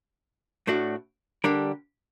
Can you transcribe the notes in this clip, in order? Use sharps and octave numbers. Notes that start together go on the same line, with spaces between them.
A2 A3 D4 F#4
D3 G3 D4 G4 A#4